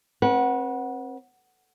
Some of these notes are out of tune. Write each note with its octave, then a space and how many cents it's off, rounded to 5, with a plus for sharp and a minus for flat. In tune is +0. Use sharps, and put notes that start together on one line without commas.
C4 +30 B4 -30 F#5 +0